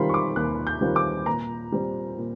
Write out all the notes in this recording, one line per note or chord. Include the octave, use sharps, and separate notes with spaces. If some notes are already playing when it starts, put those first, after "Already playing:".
Already playing: D#3 G3 C4 F4 B5 C6
C#6
D6
D#2 F#6
G6
D#3 G3 C4 F4
D6
A#2 A#5
G3 C4
A#2